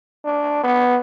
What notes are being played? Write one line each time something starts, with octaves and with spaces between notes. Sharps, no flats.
D4
B3